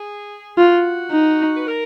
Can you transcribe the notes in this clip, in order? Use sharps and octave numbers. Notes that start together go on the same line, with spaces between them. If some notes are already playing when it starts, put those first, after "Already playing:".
Already playing: G#4
F4 F#4
D#4
B4
A#4